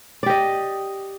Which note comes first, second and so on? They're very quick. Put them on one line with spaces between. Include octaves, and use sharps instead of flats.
D5 G4 D#5